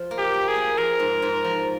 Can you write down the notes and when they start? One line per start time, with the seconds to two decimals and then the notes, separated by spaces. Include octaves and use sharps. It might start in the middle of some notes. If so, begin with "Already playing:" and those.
Already playing: F3
0.11 A#3
0.18 G4
0.33 A#3
0.48 G#4
0.56 A#3
0.78 F3 A#4
1.00 G#2
1.22 G#2
1.44 F3